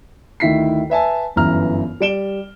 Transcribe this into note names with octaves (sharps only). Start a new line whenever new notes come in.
D2 D#3 E4 B6 C7
B4 E5 G#5 A5
G1 F#2 E3 A#5 F6
G3 D5 D7 E7 G7